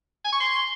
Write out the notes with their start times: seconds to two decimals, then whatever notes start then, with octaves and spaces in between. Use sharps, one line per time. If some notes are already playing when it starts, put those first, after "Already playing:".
0.25 G#5
0.32 C#6
0.40 C6